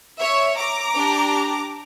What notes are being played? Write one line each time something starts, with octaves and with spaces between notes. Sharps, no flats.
C#5 E5
A#5 D6
D4 G4